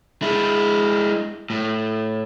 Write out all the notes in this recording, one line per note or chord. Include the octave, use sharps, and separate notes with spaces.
G#3 E4
A2